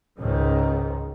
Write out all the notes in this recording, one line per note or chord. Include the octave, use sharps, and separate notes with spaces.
C#2 G#2 D#3